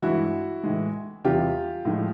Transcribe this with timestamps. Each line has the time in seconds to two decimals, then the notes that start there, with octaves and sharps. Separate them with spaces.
0.02 G2 E3 G#3 E4 F#4
0.64 A2 E3 G#3
1.24 E2 C3 E3 G3 F4 G4
1.85 A2 F3 G#3